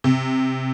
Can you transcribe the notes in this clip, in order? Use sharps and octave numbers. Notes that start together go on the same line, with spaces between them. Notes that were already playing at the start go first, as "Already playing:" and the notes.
C3